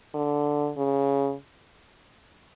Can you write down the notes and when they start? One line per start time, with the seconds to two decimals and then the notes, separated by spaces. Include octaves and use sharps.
0.14 D3
0.77 C#3